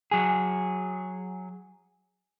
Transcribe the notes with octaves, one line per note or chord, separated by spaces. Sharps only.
F#3 G#4